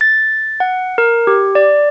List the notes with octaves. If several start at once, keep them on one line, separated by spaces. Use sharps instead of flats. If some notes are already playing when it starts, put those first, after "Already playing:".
A6
F#5
A#4
G4
D5